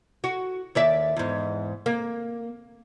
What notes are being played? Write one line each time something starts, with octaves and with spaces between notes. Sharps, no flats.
F#4
D#2 D5 E5
E2 G#2
A#3